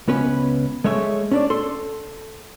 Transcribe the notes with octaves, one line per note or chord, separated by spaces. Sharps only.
C#2 B3 C#4 B4
G#3 A3 C#5 E5
C#4 D4 D5
A4 C6